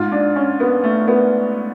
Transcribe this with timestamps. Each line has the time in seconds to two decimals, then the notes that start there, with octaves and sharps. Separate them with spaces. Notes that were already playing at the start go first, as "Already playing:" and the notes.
Already playing: G#2 F4
0.12 D4
0.36 C#4
0.60 B3
0.84 A3
1.08 B3